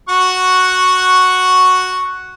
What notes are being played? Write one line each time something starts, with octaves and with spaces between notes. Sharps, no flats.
F#4 F#5 C#6